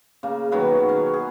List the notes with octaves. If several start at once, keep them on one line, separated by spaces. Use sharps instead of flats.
C#3 A#3
B2 D#3 F#3 B3
C#4
G#4